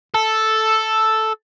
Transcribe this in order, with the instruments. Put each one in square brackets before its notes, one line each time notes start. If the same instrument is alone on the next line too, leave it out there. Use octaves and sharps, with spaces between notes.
[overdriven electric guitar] A4